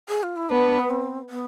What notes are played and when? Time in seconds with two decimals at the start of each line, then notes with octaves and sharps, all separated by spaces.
0.09 G#4
0.23 F4
0.36 E4
0.49 B3 D4 B4
0.79 B3
0.90 C4
1.30 B3